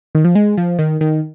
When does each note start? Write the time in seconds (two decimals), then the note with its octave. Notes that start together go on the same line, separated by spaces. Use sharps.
0.15 D#3
0.25 F3
0.35 G#3
0.57 F3
0.79 D#3
1.01 D#3